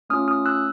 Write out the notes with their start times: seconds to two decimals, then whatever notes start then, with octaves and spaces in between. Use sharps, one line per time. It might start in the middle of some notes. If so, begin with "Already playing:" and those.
0.10 A3 C#4 F4 D#6 F6
0.28 D#6 F6
0.46 E6 F#6